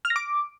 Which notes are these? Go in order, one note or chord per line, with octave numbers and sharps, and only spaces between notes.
F6
A#6
D6